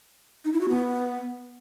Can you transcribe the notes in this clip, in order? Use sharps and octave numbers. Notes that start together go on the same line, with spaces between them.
D#4
E4
F#4
B3